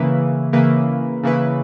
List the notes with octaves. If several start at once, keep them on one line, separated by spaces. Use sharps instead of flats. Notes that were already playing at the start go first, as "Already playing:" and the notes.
Already playing: C#3 E3 A#3 E4 B4
C#3 E3 A#3 E4 B4
C#3 E3 A#3 E4 B4